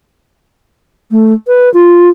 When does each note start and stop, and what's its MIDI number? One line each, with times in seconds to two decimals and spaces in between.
1.11 1.33 57
1.47 1.72 71
1.74 2.10 65